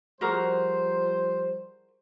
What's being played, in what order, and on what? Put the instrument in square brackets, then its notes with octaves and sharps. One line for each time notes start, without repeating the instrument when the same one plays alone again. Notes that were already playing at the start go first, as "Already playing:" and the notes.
[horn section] F3 G3 C5 [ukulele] F#4 G#4 A#4